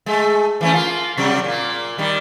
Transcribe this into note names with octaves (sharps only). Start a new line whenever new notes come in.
G#3 A3
E3 A3 C#4
A#3 F4
C3 F#3 G3
A#2 A#3
D#3 G3